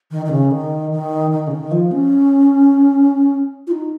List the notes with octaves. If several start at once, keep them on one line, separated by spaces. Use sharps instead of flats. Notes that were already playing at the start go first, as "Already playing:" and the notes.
D#3
D#3
C#3
D#3
D#3
D#3
C#3
D#3
F3
C#4
F4
D#4